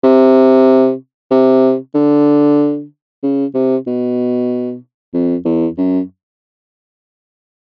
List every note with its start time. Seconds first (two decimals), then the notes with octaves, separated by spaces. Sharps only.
0.04 C3
1.31 C3
1.95 D3
3.23 C#3
3.54 C3
3.87 B2
5.13 F2
5.45 E2
5.78 F#2